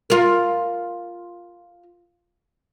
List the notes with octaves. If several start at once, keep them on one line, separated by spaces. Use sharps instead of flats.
F4 A#4